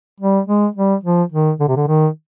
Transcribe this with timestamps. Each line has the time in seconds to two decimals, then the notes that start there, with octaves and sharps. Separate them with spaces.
0.20 G3
0.47 G#3
0.75 G3
1.03 F3
1.32 D#3
1.60 D3
1.68 C3
1.76 D3
1.88 D#3